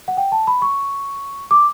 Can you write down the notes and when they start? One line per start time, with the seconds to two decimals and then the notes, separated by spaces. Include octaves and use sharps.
0.08 F#5
0.17 G5
0.32 A5
0.47 B5
0.62 C#6
1.51 D6